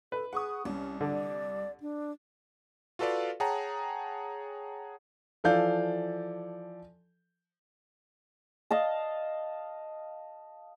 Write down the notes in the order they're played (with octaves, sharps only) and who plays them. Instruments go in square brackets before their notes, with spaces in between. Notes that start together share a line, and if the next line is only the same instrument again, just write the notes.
[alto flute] A4 [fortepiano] B4
[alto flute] G#4 [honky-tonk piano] F#5 C#6 D#6
[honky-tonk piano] C2 [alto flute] C#4
[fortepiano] D3 [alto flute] D5
[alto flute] D4
[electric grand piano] F4 F#4 A4 B4 D5 F5
G#4 C#5 F#5 G5 A5 A#5
[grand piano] E3 F3 A4 D5 F5 G6
[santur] D#5 F5 A5